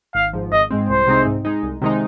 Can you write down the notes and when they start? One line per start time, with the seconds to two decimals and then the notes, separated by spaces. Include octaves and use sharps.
0.15 G#1 F5
0.33 G#2 F3
0.52 G#1 D#5
0.70 G#2 G#3 C4
0.89 C2 C5
1.07 C3 G#3 C4 D#4
1.26 G#2
1.45 G#3 D#4
1.63 C2
1.82 C3 D#3 G#3 D#4